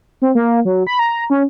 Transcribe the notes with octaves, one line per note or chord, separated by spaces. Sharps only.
C4
A#3
F#3
B5
A#5
C#4